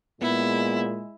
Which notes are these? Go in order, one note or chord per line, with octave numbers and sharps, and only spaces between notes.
A#2 G#3 B3 E4